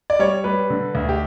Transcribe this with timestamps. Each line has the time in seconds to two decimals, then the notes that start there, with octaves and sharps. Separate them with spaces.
0.10 D5
0.19 G3 C#5
0.44 G3 B4
0.70 D3
0.95 D2
1.09 G4